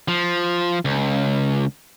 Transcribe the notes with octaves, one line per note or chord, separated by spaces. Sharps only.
F3
C#2